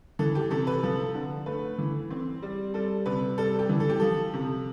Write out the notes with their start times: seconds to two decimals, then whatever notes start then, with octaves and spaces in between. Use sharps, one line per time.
0.19 E3 A4
0.35 G4
0.51 C3 A4
0.67 B4
0.83 F3 A4
1.15 D3
1.46 A3 B4
1.78 E3
2.11 C4
2.42 G3
2.74 G3 A4
3.06 C3 B4
3.38 G3 A4
3.59 G4
3.69 E3
3.80 A4
3.89 G4
4.00 F3 A4
4.34 C3